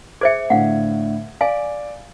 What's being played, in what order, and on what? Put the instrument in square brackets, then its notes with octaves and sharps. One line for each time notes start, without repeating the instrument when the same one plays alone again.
[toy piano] G#4 C5 E5 [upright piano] G#6 C#7
[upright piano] A2 D3 [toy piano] F5 F#5
[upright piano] D5 [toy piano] F5 G#5